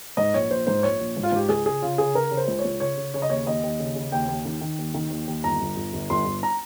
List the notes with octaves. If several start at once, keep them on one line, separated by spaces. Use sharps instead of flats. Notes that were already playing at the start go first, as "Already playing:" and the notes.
G#2 D#5
A#1 C#5
A#1 C5
G#2 C5
A#1 C#5
A#1
G#2
F4
G#2 G4
C#2 G#4
C#3 G#4
C#3 F4
C#3 G#4
C#3 A#4
C#3
C5
C#2
C#5
C#2
C#3 C#5
C#3
C#3 C#5
D#5
D#2 C#5
D#2 D#5
D#2
C#3
C#3
D#2 G5
D#2
D#3
D#3
D#2
D#3
D#2
D#2
G1 A#5
G1
G1
G1
G1 C6
G1
A#5